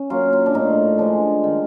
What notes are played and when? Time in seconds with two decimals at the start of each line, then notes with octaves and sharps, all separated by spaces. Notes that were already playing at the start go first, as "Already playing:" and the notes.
Already playing: C#4
0.10 F#3 A#3 F4
0.33 F4
0.46 D4
0.54 A2 D#4
0.98 F3 G#3 D4
1.44 D#3